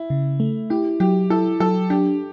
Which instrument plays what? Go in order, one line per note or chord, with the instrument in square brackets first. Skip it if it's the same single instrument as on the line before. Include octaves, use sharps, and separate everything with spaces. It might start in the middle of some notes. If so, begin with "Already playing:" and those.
Already playing: [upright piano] E4
[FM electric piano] C#3
A3
[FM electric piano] E4 [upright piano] G4
[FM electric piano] F#3 [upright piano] G4
[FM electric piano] E4 [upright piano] A4
[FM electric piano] F#3 [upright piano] A4
[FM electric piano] D4 [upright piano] G4